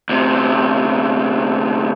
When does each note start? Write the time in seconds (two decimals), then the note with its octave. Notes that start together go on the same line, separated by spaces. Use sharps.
0.09 D2 C3